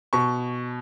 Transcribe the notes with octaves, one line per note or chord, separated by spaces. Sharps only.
B2 C#6